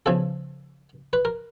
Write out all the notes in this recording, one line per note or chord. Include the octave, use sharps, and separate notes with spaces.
E2 C#3 F3 A4
B4
A#4